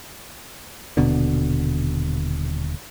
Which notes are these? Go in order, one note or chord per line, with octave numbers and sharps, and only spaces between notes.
D#1 B2 D3